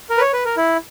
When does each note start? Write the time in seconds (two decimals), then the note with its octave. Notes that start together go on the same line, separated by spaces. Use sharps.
0.10 A#4
0.17 B4
0.21 C#5
0.33 B4
0.45 A#4
0.57 E4